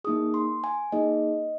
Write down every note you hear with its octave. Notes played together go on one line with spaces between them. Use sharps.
A#3 D#4 G#4 D#6
C6
G#5
A#3 D#4 G#4 D#5